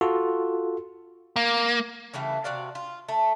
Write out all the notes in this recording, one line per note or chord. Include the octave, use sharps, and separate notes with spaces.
F4 F#4 A4
A#3
C#3 E3 G3 A3
C3 F#4 D5 F5
F4
A3